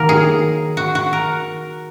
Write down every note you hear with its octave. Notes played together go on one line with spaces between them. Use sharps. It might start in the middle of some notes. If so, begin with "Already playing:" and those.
Already playing: D#3 F#3 A#3 A#4
G#4
F#4
F#4
A#4